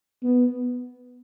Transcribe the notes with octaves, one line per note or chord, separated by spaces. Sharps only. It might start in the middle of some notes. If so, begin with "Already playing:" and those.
B3